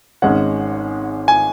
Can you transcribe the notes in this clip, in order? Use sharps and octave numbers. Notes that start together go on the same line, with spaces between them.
G#1 G#2 G#3 C#4 F#5
G#5